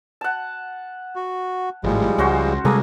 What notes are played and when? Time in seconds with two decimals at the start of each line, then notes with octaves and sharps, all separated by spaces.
0.21 F#5 A5
1.16 F#4
1.84 G#1 A2 F3 G3 G#3
2.18 C#2 C#4 F#4 C5
2.65 C3 G3 G#3 A#3 G#4 A4